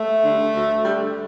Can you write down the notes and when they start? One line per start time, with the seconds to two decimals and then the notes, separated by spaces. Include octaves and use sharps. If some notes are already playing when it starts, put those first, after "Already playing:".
Already playing: A3
0.24 D3 G3
0.54 D2
0.85 D3 G3